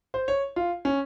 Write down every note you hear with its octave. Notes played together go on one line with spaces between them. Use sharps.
C5
C#5
F4
C#4